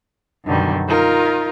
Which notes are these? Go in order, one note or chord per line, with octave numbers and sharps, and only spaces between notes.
F#2 B2 D3 D#3 F#3 G3
D#4 F4 A#4